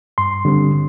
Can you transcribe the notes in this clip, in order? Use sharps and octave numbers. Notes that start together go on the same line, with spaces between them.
G2 C6
D3 G3 C4